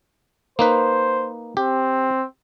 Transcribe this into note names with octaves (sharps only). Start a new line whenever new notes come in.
A#3 D#4 B4 C5
C4 G4